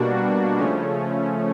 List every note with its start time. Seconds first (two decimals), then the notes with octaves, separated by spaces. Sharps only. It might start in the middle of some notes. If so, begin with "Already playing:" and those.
Already playing: B2 G3 A#3 D4 F#4
0.59 C#3 F3 A3 C#4